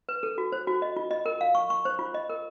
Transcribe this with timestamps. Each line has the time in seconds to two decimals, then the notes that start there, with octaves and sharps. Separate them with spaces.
0.09 B4
0.23 A4
0.38 F#4
0.52 C5
0.67 F#4
0.82 D#5
0.96 F4
1.11 D#5
1.26 A#4
1.41 F5
1.55 C#6
1.70 C#6
1.85 C5
1.99 F4
2.14 D#5
2.29 A#4